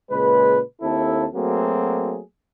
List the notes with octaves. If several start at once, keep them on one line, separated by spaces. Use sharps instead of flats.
A#2 C#3 G#3 B4
D#2 C4 E4 A4
F#3 A3 A#3 C4 F#4 G#4